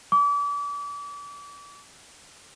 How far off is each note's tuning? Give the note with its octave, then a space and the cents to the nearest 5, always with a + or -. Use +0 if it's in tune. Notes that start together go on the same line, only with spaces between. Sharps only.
D6 -35